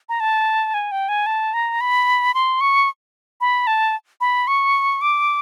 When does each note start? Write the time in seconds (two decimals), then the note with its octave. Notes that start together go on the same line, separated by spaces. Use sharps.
0.09 A#5
0.20 A5
0.74 G#5
0.92 G5
1.09 G#5
1.26 A5
1.54 A#5
1.81 B5
2.34 C6
2.61 C#6
3.41 B5
3.67 A5
4.21 B5
4.47 C#6
5.01 D6